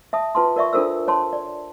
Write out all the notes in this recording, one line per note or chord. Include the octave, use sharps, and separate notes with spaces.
E5 A5 D#6
F4 B4 A5 C6
A#4 D5 E5 C#6
D4 F4 A4 A#4 C5 E6
C#5 A5 C6
D5